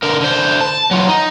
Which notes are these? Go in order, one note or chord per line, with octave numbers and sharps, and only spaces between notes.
D3 A#4
D3 C5
A5
F#3 F4
D#4